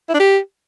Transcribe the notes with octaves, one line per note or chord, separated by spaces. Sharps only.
E4
D4
G4